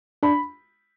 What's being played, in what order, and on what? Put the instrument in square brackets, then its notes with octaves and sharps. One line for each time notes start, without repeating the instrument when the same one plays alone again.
[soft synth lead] D4 [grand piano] B5